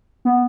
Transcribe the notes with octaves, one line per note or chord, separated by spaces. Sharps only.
B3